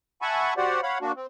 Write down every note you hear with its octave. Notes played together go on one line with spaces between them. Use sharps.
E5 F#5 G#5 A5 B5 C#6
F#4 G4 C5 D5 F#5
C#5 F5 F#5 B5
A#3 D4 F#4
C4